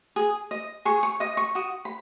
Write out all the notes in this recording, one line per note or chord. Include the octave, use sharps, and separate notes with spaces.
G#4
D#5
G#4 C#6
C#6
D#5 D#6
C#6
F#4 D#6
B5